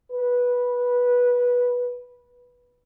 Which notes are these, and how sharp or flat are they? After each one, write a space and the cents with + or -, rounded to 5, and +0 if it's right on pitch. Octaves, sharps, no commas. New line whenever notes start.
B4 -15